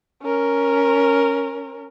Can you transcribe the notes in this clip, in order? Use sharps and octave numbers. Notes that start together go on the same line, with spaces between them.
C#4 A#4